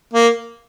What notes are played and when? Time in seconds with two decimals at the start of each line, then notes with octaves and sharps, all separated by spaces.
0.14 A#3